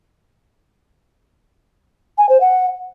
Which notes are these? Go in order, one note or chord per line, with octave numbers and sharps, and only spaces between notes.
G#5
C5
F#5